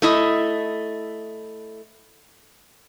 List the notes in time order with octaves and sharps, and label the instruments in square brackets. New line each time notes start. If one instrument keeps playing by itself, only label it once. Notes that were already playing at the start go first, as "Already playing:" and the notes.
[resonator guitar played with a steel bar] A3 E4 D#5